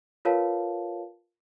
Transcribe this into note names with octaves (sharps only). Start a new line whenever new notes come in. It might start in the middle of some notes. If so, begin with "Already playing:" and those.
F4 A#4 B4 C#5 F5 A5